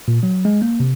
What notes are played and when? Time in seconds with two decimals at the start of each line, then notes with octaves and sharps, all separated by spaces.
0.08 A#2
0.23 F#3
0.45 G#3
0.62 A#3
0.80 C3